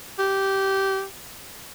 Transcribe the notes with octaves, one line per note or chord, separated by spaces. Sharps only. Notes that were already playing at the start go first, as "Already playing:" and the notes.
G4